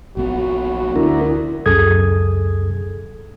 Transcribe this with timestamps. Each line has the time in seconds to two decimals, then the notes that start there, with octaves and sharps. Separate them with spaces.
0.17 A#1 B3 F#4
0.96 D2 D4 E4 A#4
1.66 C#2 F#2 G#4 A4 D#6 G#6